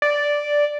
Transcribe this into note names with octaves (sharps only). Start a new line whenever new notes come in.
D5